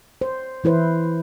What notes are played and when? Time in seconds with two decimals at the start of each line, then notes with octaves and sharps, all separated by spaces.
0.21 C5
0.64 E3 E4 B4 C5